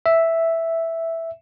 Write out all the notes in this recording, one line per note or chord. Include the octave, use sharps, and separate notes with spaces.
E5